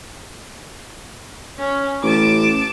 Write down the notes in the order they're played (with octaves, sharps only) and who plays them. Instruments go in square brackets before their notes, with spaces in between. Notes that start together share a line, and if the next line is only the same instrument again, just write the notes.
[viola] C#4
[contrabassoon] A1 [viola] A5 D6